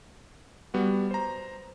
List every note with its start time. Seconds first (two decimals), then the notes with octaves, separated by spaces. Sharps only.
0.74 G3 B3 F#4
1.11 C5 A#5